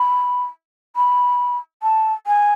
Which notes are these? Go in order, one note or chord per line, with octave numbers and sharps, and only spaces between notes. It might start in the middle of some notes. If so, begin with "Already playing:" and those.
Already playing: B5
B5
A5
G#5